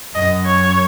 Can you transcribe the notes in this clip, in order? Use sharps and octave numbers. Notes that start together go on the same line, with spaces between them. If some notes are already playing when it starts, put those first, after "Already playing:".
F#2 D#5
C#5